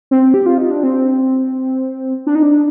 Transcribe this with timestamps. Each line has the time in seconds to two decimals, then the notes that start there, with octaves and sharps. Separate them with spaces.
0.11 C4
0.34 G4
0.46 F4
0.58 D#4
0.71 D4
0.83 C4
2.27 D4
2.35 D#4
2.43 D4